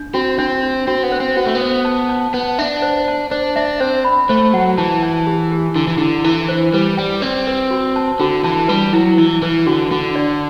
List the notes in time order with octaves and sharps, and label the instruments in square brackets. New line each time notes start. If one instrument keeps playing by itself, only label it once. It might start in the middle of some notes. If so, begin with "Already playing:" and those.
Already playing: [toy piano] D4
[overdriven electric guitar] C4 [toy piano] F#4
[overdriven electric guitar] C4 [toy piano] D4
[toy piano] D4
[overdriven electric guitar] C4 [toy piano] F#4
[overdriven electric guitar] B3
[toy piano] C5
[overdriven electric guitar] C4
[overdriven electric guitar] B3 [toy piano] F#4
[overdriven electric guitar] A3
B3
[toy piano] C5
A5
A5
[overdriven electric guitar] B3 [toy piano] A5
[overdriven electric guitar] D4 [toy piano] E5
[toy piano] C5
A5
[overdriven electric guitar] D4 [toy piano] C5
[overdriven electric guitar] D4 [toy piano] E5
[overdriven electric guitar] C4 [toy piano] C5
[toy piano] B5
[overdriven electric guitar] A3 [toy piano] C5
[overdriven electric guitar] F#3 [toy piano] F#5
[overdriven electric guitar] E3 [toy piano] A5
[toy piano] A5
G4
G4
[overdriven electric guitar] D3 [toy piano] E4
[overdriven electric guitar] E3
[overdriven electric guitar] D3 [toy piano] E4
[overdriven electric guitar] E3 [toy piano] E4
[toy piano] C5
[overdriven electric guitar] G3 [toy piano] B4
[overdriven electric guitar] G3 [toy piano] G5
[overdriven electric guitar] C4 [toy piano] D5
[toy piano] B4
F#4
A5
[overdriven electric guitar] D3 [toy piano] F#4
[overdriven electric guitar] E3 [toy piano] A5
[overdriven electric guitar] G3 [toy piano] B4
[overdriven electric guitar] F#3 [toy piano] E4
[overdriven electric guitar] E3 [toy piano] E4
[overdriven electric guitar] E3 [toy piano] B4
[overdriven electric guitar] D3 [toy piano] F#4
[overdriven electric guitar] D3 [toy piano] F#4
[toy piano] D5